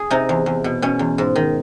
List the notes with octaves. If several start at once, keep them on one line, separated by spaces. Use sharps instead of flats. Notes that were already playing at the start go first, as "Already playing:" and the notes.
Already playing: G#4
C3 D#4
E2
E2
B2
B2 C#4
E2
G#2
D#3